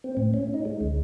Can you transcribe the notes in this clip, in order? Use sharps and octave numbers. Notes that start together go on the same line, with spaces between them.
C4
A2
C#4
D#4
G#3
D2